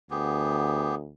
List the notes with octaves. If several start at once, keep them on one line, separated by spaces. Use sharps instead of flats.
D2 B3 G4 G#4